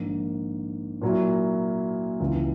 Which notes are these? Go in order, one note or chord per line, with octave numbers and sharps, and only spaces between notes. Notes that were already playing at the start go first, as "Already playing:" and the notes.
Already playing: A#1 G#2 D#3 A#3
A#2 F#3 A#3 E4
C#2 C#3 E3